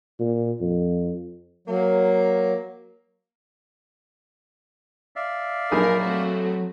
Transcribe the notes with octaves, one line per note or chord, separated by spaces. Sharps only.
A#2
F2
F#3 A#3
D5 E5 F5
A#1 F#3 D#4 G#4 A#4
A3 C4 F#4